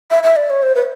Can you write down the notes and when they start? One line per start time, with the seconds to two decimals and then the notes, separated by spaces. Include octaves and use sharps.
0.11 E5
0.23 E5
0.36 D5
0.50 C#5
0.63 C5
0.75 B4